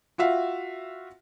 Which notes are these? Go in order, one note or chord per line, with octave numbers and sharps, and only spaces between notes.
F4 F#4 E5 F5